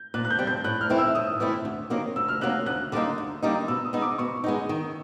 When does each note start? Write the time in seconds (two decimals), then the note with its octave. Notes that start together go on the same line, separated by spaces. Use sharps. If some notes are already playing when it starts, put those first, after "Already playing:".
Already playing: G6
0.14 A#2 F#6
0.25 F#6
0.31 G6
0.39 G3 C4
0.47 G6
0.64 A2 F#6
0.81 F6
0.90 E3 A3 C4 E4
0.98 E6
1.15 A2 D#6
1.40 E3 A3 C4 E4
1.65 D2
1.90 C3 D#3 F#3 A#3
2.16 D2 E6
2.28 F6
2.41 C3 D#3 F#3 A#3 F#6
2.66 D2 F#6
2.92 D3 G3 A#3 D#4
3.18 D2
3.42 D3 G3 A#3 D#4
3.68 B2 E6
3.85 D#6
3.93 G#3 B3 D#4
4.02 D6
4.18 B2 C#6
4.44 G#3 B3 D#4
4.69 D#3